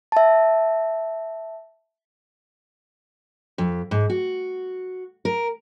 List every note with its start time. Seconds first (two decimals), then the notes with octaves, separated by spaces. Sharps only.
0.12 E5 A5
3.58 F2
3.91 G#2
4.10 F#4
5.25 A#4